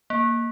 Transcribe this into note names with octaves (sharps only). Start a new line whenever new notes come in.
A#3